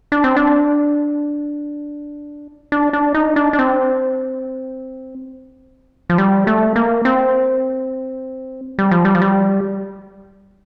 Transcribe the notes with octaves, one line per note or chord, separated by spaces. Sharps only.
D4
C4
D4
D4
D4
D#4
D4
D4
C4
F3
G3
A3
A#3
C4
G3
F3
G3
F3
G3